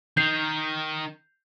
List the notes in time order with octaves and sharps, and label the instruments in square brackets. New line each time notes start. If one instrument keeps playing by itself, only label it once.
[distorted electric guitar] D#3 [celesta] G6 C7 F7